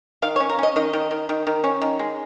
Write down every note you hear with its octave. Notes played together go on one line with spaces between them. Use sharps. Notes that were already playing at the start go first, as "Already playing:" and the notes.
D#3 F5
C#5
C#4
A#4
C#4 D#5
D#3 D#5
D#3
D#3
D#3
D#3
C#4
D#3
G#3